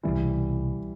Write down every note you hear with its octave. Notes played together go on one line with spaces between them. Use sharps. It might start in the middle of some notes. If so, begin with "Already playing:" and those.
C2 B2 E3 G3 A3 C4